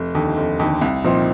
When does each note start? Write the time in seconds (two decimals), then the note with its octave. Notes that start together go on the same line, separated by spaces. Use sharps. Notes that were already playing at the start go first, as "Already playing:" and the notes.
Already playing: F1
0.15 D#2 D3
0.37 F1
0.59 D#2 D3
0.82 C2
1.04 A#2 F3 C4 D#4